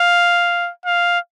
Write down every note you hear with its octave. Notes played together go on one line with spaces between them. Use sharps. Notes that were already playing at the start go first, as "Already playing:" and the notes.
Already playing: F5
F5